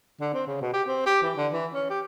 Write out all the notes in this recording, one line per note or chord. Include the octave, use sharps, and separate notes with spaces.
D3
C4
C#3
B2
G4
C4
G4
E3
D3
E3
C#4
G4